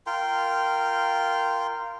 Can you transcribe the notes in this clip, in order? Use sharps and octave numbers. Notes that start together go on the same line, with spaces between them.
F4 A#4 G5 C6